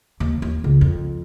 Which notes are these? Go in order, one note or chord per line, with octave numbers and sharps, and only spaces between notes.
D#2
D#2
C#2
F2